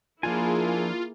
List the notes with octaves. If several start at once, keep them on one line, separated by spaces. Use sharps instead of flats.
F3 A#3 D4 E4 F4 G#4 G#5